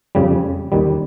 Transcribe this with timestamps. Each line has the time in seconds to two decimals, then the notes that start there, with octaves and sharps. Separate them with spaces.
0.15 F2 C#3 G3
0.72 D#2 D#3 G3